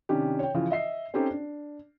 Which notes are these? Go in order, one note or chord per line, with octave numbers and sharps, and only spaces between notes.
C3 D#3 C#4 D4 G4
C#5 G5
C#3 E3 F3
D#5 E5 C7
C4 C#4 D#4 G4 A4 C5
D4